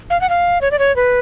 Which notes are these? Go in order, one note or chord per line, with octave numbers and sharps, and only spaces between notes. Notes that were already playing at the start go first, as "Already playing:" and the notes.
F5
F#5
F5
C#5
D5
C#5
B4